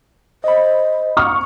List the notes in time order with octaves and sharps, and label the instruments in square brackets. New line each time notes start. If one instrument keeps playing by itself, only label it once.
[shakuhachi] C5 [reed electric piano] D#5 B5
[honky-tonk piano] C#6 F6